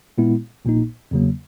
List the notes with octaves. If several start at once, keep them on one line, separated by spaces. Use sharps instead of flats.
A#2 G#3 B3 E4
A#1 A#2 A#3 D#4
E2 C#3 F#3 A#3